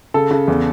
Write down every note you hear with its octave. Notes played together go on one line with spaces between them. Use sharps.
C#3 A4
C#3
E2